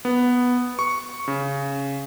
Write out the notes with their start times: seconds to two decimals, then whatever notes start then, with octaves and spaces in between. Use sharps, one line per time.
0.05 B3
0.79 C#6
1.28 C#3